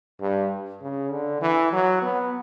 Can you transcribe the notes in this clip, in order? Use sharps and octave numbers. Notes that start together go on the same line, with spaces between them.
G2
C#3
D3
E3
F#3
B3